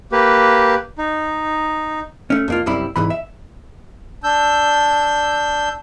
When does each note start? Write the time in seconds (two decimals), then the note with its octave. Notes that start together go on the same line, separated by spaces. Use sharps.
0.12 A#3 G4 B4
0.98 D#4
2.30 A3 C#4
2.48 F2 A#3 F4
2.66 C2 F#2 G3 C4 E4 B5
2.96 C2 G#2 E3 B5
3.10 E5
4.24 D4 E6 G6